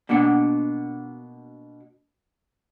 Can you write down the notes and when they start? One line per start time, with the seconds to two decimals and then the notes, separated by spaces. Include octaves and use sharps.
0.09 B2 A#3 D4 F#5